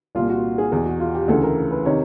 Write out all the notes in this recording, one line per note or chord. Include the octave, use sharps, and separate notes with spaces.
C2 A#2 F4
F#4
G#4
E2 B2 G#4
F#4
F4
G4
D2 C#3 E3 A4
A#4
B4
C3 D#3 C#5